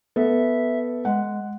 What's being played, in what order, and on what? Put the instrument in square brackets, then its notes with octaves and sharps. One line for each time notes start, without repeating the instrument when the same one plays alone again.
[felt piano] B3 A4 [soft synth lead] E5
[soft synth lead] G#3 [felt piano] F#5